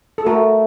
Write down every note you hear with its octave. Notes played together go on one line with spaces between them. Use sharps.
A4
A3 F#4 A#4